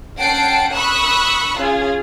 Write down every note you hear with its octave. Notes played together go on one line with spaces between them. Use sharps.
C#4 F#5 G5 A5 C7 D7
B5 C#6 D#6 E6 F#6
C#4 F4 G#4